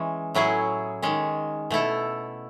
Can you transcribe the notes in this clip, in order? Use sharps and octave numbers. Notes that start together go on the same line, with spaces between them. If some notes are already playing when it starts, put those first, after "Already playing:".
Already playing: E3 G#3 C#4
A2 F#3 C#4 E4 G#4
D#3 G#3 C#4
B2 A3 E4 A4